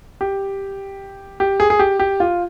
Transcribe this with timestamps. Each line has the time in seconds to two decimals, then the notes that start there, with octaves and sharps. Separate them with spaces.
0.21 G4
1.40 G4
1.60 G#4
1.70 G#4
1.79 G4
1.99 G4
2.20 F4